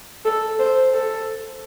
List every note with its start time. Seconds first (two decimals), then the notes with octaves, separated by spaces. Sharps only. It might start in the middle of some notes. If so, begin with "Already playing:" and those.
0.25 A4
0.59 C5
0.94 A4